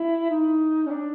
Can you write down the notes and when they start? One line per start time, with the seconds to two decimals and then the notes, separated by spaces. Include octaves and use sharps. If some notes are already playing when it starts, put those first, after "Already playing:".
Already playing: E4
0.30 D#4
0.86 C#4
0.90 D4